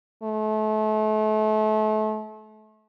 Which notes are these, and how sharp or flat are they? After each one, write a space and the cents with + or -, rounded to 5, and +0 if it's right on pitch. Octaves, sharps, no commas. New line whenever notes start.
A3 -35